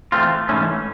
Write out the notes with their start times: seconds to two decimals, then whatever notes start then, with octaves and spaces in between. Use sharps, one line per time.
0.12 E3 A3 C4 F4
0.49 G#2 E3 A3 C#4